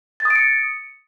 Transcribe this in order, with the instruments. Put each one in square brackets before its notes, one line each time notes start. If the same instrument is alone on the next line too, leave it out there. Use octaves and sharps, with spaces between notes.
[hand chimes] A6
D#6
D7
C#7